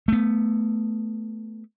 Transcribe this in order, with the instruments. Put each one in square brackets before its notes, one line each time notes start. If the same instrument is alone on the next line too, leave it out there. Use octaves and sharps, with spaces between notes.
[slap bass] A3 B3